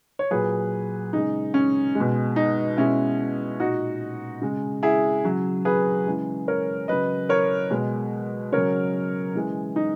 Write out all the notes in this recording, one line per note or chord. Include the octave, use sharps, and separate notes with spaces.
C#5
A#2 F#3 G#4 B4
C#3 G#3 D#4
C#4
G#3
B2
D#4
B2 G#3 C#4 E4
A#2 G#3 D#4 F#4
C#3 G#3
E4 G#4
C#3 F#3
G#4 B4
C#3 E3 G#3
A#4 C#5
C#3 F#3 B4 D#5
A#4 C#5
B2 G#3
C#3 F#3 A#4 C#5
C#3 E3 G#3
D#4